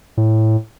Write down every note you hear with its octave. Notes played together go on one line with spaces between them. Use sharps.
A2